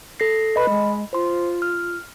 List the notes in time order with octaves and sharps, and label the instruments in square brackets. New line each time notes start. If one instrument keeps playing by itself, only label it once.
[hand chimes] A4 A#6 C7
[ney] B4 [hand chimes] D#5 B5
[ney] G#3
[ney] F4 [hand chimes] C5 C6
[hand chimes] F6